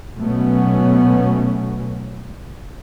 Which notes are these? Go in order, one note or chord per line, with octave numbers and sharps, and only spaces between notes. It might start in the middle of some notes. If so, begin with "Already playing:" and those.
B2 F#3 A3 B3 C#4